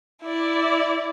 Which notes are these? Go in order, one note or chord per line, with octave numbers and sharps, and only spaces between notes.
E4 D5